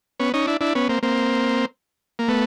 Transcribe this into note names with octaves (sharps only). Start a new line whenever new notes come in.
B3 C#4
C#4 D#4
D4 E4
D4 E4
B3 C#4
A#3 C4
A#3 C4
A#3
A3 B3